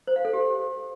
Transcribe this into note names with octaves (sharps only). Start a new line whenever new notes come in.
C5
F5
A4
G4